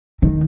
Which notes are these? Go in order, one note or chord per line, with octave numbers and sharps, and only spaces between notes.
D#3